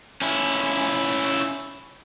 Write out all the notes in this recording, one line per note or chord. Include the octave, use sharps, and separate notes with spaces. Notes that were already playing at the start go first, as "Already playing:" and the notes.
C#4 E4